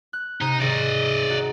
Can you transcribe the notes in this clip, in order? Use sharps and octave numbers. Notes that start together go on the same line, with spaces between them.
F#6
C3 D#4
G#1 D5 D#5 C#6
D#4 F#4